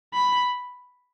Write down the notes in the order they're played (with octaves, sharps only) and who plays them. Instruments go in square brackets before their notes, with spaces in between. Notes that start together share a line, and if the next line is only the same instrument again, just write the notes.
[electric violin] B5